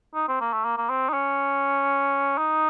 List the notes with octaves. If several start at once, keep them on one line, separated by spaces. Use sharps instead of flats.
D#4
C4
A#3
A3
A#3
A#3
C4
D#4
C#4
D#4